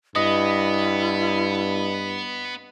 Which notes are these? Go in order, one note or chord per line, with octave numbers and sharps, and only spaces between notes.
G2 B3 E4 D#5